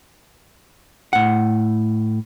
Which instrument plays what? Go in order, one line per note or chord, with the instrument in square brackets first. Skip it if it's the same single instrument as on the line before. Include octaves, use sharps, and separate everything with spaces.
[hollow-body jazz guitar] A2 F#5